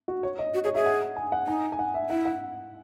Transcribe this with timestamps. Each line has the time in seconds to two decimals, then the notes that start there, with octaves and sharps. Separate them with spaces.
0.08 F#4
0.23 C#5
0.39 D#5
0.54 F#4
0.64 G#4 C#5
0.74 G#4 E5
0.86 F#5
1.16 G#5
1.32 F#5
1.47 D#4 G#5
1.72 G#5
1.79 F#5
1.94 E5
2.09 E4 F#5
2.25 F#5